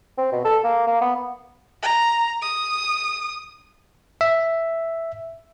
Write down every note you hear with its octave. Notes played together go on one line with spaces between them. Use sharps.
C4
B2
A4
A#3
A#3
B3
A#5
D#6
E5